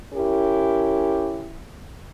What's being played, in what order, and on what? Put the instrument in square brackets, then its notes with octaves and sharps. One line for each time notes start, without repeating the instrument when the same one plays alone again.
[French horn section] C#4 E4 G4 A#4